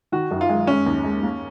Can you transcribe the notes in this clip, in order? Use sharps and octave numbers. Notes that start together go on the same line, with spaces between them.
D#3 F#4
F#2
F4
G#3
G#3 C#4
D#2
G#3
A#3